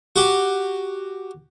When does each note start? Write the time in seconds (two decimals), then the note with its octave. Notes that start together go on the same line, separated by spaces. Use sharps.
0.16 F#4 G4